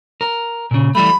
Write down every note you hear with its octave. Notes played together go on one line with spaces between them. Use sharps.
A#4
A#2 C#3
E3 G3 A3 B5